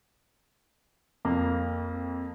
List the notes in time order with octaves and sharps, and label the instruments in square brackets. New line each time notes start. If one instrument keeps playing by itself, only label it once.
[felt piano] F2 [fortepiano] A#3